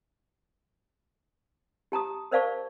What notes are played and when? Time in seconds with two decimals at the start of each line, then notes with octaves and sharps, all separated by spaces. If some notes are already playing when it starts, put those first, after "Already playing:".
1.92 G4 A5 A#5 D#6
2.31 A#4 C5 D5 F5 A5 C#6